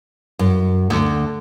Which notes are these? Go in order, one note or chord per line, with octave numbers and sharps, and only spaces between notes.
F#2
D2